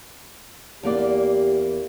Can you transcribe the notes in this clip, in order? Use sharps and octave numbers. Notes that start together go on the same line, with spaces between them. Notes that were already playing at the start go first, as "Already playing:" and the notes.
E2 A#3 G4 D5